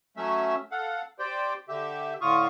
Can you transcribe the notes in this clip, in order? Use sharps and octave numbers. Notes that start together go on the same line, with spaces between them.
F#3 A3 C#4 E5
A4 F5 F#5
G4 C5 D5 G5
D3 G4 E5
A2 D3 F4 F5 C#6 D#6